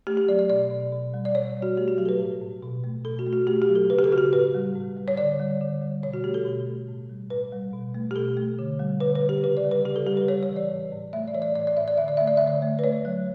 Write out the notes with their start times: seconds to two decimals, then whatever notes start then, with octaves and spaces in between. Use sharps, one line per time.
0.07 A3 G4
0.17 G4
0.28 F#3 D5
0.39 D5
0.49 B2 D5
0.70 B2
0.93 B2
1.14 G3
1.25 D5
1.34 B2 C#5
1.57 G3
1.62 F#4
1.77 A3 G4
1.88 F#4
1.98 F#3 G4
2.05 A4
2.09 B4
2.19 A2
2.41 A2
2.63 B2
2.84 A3
3.05 B2 A4
3.19 F#4
3.26 A3
3.33 F#4
3.47 A3 G4
3.62 G4
3.68 F#3
3.75 A4
3.90 C#3 B4
3.99 G4
4.04 A4
4.12 C#3 F#4
4.18 G4
4.33 A2 B4
4.54 G3
4.75 A2
4.97 G3
5.08 C#5
5.17 D3 D5
5.40 G3
5.61 D3
5.81 G3
6.03 B2 C#5
6.14 F#4
6.24 A3 G4
6.34 A4
6.45 B2
6.67 A3
6.88 A2
7.09 G3
7.30 A2 B4
7.52 G3
7.73 B2
7.95 A3
8.11 G4
8.16 B2 A4
8.37 A3
8.59 D3
8.79 G3
9.00 D3 B4
9.15 B4
9.22 G3
9.29 G4
9.43 C#3 B4
9.57 D5
9.64 G3
9.71 B4
9.85 C#3 G4
9.96 A4
10.06 G3 G4
10.17 B4
10.28 G3 C#5
10.43 C#5
10.49 E3
10.56 D5
10.71 A2
10.92 A2
11.13 A3 E5
11.28 D5
11.34 E3 C#5
11.42 D5
11.55 A2 D5
11.67 D5
11.77 A2 E5
11.88 D5
11.97 D3 E5
12.08 D5
12.17 A3 E5
12.28 D5
12.37 D3 E5
12.47 D5
12.62 A3
12.79 B4
12.84 A3 C#5
13.05 F#3